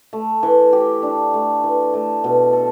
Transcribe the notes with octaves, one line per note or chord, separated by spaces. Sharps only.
A3
E3
G4
D4
A3
E3
A3
B2
A4